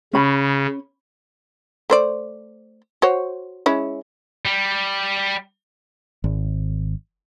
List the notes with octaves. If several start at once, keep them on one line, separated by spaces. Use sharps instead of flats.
C#3 C#4 B5
A3 C5 D5
F#4 C5 C#5
G#3 C#4 E4
G3
G#1